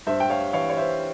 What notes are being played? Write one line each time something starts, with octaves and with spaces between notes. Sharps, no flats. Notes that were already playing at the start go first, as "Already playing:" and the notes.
G2 C5 E5
G5
C#5 F5
E3 C#5 F5
C#5
C5 E5